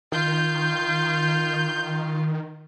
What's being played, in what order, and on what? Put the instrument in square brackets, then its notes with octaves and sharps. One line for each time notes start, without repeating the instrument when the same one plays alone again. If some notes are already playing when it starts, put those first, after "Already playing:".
[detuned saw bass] D#3 [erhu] F4 [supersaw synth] G6